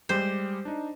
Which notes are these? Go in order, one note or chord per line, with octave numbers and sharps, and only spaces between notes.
G3 G#3 G4 C5
D4 D#4